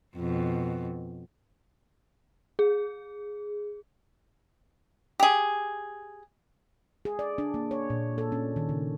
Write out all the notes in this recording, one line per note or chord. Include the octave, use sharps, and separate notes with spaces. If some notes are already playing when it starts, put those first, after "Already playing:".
F2 B2
G#4
G4 G#4
G#4
D5
D4
A#3
C#5
A#2
A4
C#4
D#3
C#3